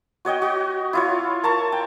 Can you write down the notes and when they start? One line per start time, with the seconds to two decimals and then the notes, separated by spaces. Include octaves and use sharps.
0.25 F#4 C#5 D#5 G5
0.42 F#4
0.93 E4 F4 C#5
1.43 A#4 A5 A#5 C#6
1.72 G5